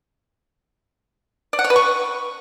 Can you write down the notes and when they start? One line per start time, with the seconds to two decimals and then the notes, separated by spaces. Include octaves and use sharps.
1.53 D5
1.59 F#5
1.64 C#5
1.70 B4
1.76 C#6